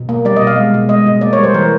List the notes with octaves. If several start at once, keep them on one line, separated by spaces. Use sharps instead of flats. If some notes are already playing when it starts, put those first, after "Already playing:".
Already playing: B2
A#3
G3 D5
D#5
B2
F5
G#3
B2
G#3 D#5
B2
A#3 D5
G3 C#5
C5
E3 A#4